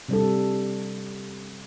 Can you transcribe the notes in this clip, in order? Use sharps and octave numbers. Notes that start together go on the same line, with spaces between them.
C3 G3 D4 A4